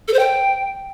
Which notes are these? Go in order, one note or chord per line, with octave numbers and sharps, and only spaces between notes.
A4
C5
G5